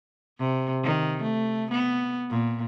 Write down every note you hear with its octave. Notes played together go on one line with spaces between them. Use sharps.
C3
D#3
A3
B3
A#2